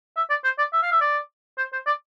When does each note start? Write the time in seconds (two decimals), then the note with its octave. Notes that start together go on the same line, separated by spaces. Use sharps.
0.16 E5
0.30 D5
0.44 C5
0.58 D5
0.73 E5
0.83 F5
0.92 E5
1.01 D5
1.58 C5
1.73 C5
1.87 D5